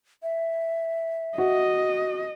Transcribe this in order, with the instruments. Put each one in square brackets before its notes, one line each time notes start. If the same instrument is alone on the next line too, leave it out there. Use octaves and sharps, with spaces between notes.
[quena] E5
[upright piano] F#4 [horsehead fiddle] D#5